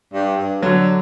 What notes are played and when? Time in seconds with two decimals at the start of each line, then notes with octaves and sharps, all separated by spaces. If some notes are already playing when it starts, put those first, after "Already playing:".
0.12 G2
0.37 G2
0.62 D3 F#3